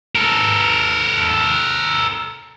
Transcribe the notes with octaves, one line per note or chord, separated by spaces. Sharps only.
A4 A#4